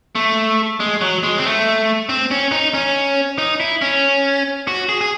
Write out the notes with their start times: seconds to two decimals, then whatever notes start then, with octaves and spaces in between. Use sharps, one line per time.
0.15 A3
0.80 G#3
1.01 F#3
1.23 G#3
1.38 C4
1.45 A3
2.09 C4
2.31 C#4
2.52 D#4
2.74 C#4
3.38 D#4
3.60 E4
3.82 C#4
4.68 F#4
4.89 G#4
5.01 G#4